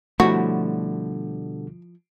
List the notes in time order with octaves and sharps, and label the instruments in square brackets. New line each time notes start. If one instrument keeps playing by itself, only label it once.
[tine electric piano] B2 D3 G3 [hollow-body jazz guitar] F3 E4 C#5 [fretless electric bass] A3 [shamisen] F#4